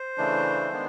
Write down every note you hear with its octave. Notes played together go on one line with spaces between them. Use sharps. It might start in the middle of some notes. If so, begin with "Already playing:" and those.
Already playing: C5
C#3 E3 A3 D4
D#3 G#3 B3 D4